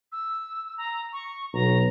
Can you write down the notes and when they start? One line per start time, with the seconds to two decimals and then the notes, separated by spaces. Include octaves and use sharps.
0.12 E6
0.78 A#5
1.13 C#6
1.54 B1 A#5